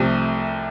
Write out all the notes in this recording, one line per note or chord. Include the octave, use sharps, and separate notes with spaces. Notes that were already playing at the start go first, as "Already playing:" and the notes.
Already playing: C2 C3 F3 A3